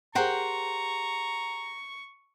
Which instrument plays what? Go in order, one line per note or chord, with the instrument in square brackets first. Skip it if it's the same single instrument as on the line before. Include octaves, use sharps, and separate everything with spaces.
[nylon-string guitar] G4 G#4 A#4 [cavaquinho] C5 F#5 G5 [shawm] A#5 [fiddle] C#6